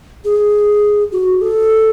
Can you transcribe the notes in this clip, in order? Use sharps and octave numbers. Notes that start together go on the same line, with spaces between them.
G#4
F#4
A4